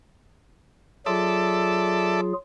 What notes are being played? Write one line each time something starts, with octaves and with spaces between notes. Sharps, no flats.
F#3 F4 G#4 A4 D5 E5